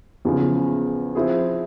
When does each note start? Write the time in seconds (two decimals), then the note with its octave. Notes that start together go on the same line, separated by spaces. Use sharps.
0.25 E2 C#3 F3
1.15 F3 C4 E4 G#4